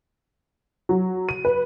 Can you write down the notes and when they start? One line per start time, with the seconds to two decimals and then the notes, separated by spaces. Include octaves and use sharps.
0.89 F#3
1.29 D#7
1.45 B4